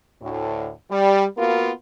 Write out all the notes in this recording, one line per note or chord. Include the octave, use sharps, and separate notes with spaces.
D2 A2
G3
A#3 B3 F4 F#4 A#4